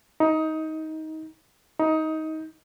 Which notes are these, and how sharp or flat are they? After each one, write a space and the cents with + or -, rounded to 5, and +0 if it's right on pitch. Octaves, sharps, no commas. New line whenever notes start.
D#4 +20
D#4 +20